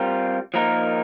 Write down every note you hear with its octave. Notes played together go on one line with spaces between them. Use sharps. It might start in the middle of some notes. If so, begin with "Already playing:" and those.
Already playing: G3 C4 F4 A#4
F3 A#3 D#4 A#4